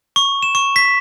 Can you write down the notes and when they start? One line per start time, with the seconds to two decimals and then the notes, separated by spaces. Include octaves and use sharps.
0.16 C#6
0.43 E7
0.55 C#6
0.76 B6